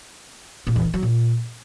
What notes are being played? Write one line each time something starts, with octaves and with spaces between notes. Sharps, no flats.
A#2
E2
D#3
F#3
A#2